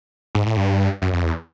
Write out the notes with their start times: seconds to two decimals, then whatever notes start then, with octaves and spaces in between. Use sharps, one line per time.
0.35 G#2
0.46 A2
0.57 G2
1.02 F#2
1.13 F2
1.23 E2